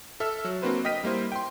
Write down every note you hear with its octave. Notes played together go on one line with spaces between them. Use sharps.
A4 E5 E6 F6
F#3
A#3 C4 D4 F#4 B4 C5
D#5 G5 F6 B6 D#7
G3 A#3 E4 C5
G5 C6